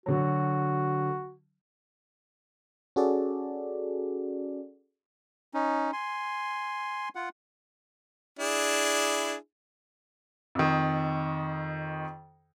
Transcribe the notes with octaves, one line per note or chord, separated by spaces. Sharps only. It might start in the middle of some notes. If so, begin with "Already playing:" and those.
D3 F#3 F#4
C#4 F#4 G#4 A4 D5
C#4 D#4
G#5 C6
F4 F#5
D4 E4 G#4
F2 D#3